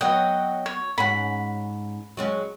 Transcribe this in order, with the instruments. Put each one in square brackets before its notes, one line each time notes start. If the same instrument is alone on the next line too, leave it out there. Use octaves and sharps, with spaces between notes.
[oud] F#3 B3 [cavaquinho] D#5 G5
[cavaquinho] C#5
[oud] G#2 C#4 F#4 [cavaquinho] B5
[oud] F#3 G#3 C#4